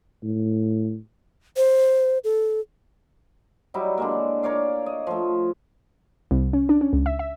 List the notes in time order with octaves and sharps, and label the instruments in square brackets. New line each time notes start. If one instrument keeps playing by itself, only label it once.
[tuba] A2
[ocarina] C5
A4
[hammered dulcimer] F#3 G3 D#4 E4
D3 G#3 A#3
A#4 C#5 D5 F5
D#5
F3 A3
[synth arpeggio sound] C2
C#4
D4
C#4
C#2
E5
E5